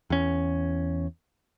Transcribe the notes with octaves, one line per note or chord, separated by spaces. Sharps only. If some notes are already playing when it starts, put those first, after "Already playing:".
E2 C#4